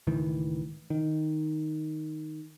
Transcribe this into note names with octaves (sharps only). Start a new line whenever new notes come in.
C#2 A2 D#3 E3
D#3